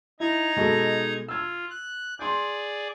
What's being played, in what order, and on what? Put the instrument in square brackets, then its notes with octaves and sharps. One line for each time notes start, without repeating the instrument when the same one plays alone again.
[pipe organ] D#4 A#5 G#6 [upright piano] E4
[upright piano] B2 G#3 A4
[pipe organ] F4 [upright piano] E6 G#6
[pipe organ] F#6
[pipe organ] G#4 D5 [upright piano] C6 G6